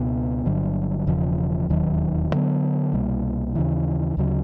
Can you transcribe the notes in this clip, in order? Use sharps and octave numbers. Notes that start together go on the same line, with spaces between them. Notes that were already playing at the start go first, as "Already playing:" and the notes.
Already playing: C#2 B2 B3
G1 G2 D3 F#3
E1 E2 C#3 F3
E1 D#2 D#3 F#3
D2 D3 F#3 B3
C2 B2 G3 A#3
D#2 C#3 E3
D2 C#3 F#3